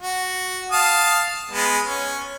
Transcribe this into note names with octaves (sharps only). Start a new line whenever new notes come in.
F#4
F5 A5 D#6
G#3 B3
C#4